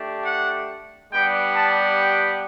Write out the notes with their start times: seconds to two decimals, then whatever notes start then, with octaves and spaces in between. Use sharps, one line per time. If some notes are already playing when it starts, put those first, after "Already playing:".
Already playing: A3 D4 G4
0.25 F#5
1.12 G3 B3 D4 G4 G5
1.56 A5
2.00 G5